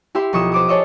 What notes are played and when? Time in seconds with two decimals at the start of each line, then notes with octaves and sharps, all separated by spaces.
0.15 E4 G4 E5 C6
0.33 B1 F3 C#6 D#6 E7
0.52 C5 D6 D#6
0.68 G#4 A4 C#5 D#5 E5